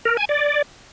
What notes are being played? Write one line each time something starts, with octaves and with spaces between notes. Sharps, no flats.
A#4
G#5
D5